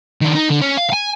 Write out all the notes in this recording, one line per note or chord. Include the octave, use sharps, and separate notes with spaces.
D#3 D4
D#4
D3
C#4
F5
F5 G#5